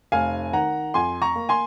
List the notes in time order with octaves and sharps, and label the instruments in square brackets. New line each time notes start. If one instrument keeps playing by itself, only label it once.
[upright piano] F1 F5 G#5
D#3 F#5 A#5
F2 G#5 C6
A#5 C#6
A#3
G#5 C6